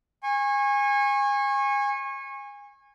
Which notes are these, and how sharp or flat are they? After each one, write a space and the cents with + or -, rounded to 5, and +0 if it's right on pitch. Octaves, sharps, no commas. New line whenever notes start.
G#5 -25 C#6 -30